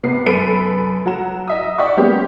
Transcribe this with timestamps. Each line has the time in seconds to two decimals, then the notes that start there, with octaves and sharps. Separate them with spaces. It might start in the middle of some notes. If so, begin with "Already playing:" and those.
0.03 C3 B3 C7
0.26 F#2 A4 B4 D7 D#7
1.06 F#3 F#5 A#5 E7
1.48 D#5 E5 D#6
1.78 D5 E5 F#5 G5 C#6
1.97 F#3 G#3 A#3 B3 C#4 G4